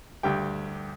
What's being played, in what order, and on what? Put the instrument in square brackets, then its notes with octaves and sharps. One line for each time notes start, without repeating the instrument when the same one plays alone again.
[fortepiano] D2 G2 G4 G5